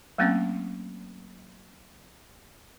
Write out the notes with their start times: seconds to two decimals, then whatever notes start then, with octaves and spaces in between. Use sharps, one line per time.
0.18 F#3 A3 A#3 C4 C#4